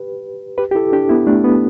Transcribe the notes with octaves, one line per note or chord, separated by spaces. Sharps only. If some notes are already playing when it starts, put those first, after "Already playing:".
Already playing: G4 B4
G4 B4
G4
E4 A4
D4 G4
B3 E4
A3 D4
B3